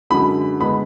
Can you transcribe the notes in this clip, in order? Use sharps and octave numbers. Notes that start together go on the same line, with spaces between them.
F#2 D3 G#3 B5
D3 G#3 B3 B5